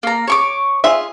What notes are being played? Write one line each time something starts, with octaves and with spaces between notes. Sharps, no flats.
A#3 A#5
C#5 C#6 D6
F4 G#4 E5